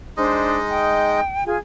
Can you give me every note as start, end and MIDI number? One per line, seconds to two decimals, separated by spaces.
0.17 1.21 56
0.17 0.58 62
0.17 1.21 63
0.17 0.58 72
0.17 1.21 75
0.69 1.46 79
1.46 1.57 65
1.46 1.57 68
1.46 1.57 80